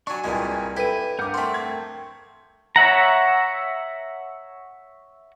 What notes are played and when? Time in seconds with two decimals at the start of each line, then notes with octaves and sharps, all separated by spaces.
0.07 F#3 D4 G#5 C#6
0.24 C2 G2 A#2 G#3
0.77 E4 A4 B4 G5 D#7
1.19 G2 A#4 F#5 D6 F6 G6
1.34 A3 C4 G5 C6
1.54 G#6
2.76 C#5 E5 F#5 A#5